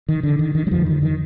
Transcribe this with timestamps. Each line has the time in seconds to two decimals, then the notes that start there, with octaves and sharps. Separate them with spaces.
0.09 D#3
0.23 D3
0.39 D#3
0.55 D#3
0.67 G3
0.71 F2 D3 F3
0.86 D#3
1.02 D#3